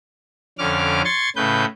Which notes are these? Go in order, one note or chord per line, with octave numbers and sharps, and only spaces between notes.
F2 D3 C#4 D6 F6
C6 C#6 G#6 A6
A2 C#3 B4 G6